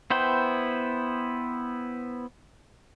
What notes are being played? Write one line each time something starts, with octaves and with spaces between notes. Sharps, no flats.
B3 E4 C5 G5